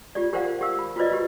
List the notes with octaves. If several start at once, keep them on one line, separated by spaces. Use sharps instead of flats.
F4 G4 D5
G4 A#4 C5 D5 F5 F#5
G4 F5 E6
B5
F4 F#4 B4 C5 D5 D#5
F#4 G4